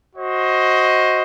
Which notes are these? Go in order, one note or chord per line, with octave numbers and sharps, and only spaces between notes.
F#4 C5 D#5